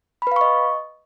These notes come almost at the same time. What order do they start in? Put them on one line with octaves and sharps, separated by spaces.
B5 B4 F5 C#6 D#5